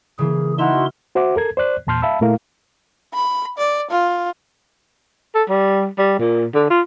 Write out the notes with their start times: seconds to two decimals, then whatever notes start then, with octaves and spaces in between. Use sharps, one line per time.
0.19 C#3 E3 A#3 G#4
0.59 D#4 E4 F#4 E5 C6 F6
1.15 F#4 C5 E5 F#5 D6
1.36 A4 A#4 G#6
1.57 C5 D5 F#6
1.87 E2 A#2 A5 C6 F6 G6
2.02 E5 F5 A5 B5 E6
2.21 A#2 A3 E4 A#4 F5
3.14 B5
3.58 D5
3.90 F4
5.35 A4
5.49 G3
5.98 G3
6.20 A#2
6.54 D3
6.70 F4